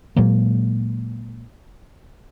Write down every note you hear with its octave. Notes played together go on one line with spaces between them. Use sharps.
A#2 F#3 G#3 A#3